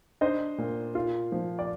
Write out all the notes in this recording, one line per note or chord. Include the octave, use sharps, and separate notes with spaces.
D4 C5 D#5
A#2
F4
F3
D5